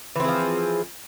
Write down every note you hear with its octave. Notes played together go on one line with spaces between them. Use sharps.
E3 F3 C4 G#4